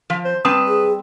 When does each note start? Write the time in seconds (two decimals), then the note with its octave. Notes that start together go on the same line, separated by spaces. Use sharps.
0.10 F3
0.24 C5
0.45 G3 C4 B4 A5 D#6
0.68 G#4